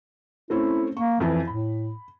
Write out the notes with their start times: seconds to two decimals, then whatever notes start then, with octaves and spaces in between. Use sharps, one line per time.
0.50 A3 C4 C#4 E4
0.97 A#3 C#6
1.20 F2 E3 E4 G#5
1.47 A2 B5